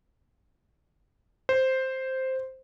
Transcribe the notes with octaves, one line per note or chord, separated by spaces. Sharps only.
C5